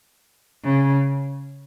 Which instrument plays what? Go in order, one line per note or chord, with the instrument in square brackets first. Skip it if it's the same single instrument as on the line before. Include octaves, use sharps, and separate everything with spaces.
[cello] C#3